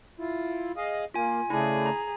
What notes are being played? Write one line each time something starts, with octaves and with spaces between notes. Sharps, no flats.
E4 F4
G#4 D#5 F5
A#3 F4 G#5
C#3 A3 D4 E4 G#4
A#5